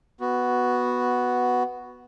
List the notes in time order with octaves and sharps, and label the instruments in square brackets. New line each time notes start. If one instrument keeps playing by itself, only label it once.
[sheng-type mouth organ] B3 F#4